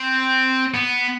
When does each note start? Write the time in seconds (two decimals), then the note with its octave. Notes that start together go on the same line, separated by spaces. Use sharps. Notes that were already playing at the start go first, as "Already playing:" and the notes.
Already playing: C4
0.74 B3